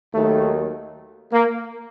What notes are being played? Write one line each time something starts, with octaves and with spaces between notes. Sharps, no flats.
D#2 D#3 F#3 A3
A#3